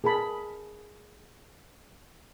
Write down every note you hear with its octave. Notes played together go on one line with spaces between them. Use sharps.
G#4 A#4 A5 B5